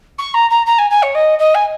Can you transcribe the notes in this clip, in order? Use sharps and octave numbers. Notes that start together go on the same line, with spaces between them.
C#6
A#5
A#5
A#5
G#5
G#5
C#5
D#5
D#5
G#5